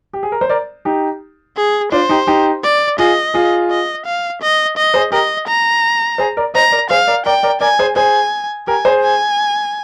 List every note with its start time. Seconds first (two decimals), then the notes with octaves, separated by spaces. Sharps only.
0.13 G4
0.23 G#4
0.32 A#4
0.41 C5
0.49 A#4 D5
0.85 D#4 G4
1.57 G#4
1.92 D4 F4 C5
2.09 D#4 G4
2.27 D#4 G4
2.63 D5
2.99 F4 G#4 D#5
3.34 F4 G#4
3.70 D#5
4.06 F5
4.42 D#5
4.77 D#5
4.94 G#4 C5
5.12 G4 A#4 D#5
5.47 A#5
6.18 G#4 C5
6.37 A#4 D5
6.54 C5 D#5 A#5
6.72 A#4 D5
6.90 G#4 C5 F5
7.07 A#4 D5
7.26 A#4 D5 G5
7.43 A#4 D5
7.61 A#4 D5 G#5
7.79 G#4 C5
7.96 G#4 C5 G#5
8.67 G4 A#4 G#5
8.85 G#4 C5
9.03 G#5